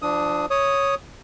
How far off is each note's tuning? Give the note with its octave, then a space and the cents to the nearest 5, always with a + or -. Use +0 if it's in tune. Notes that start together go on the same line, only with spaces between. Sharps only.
F3 -20 D4 +10 D#6 +15
C#5 +0 D#6 +0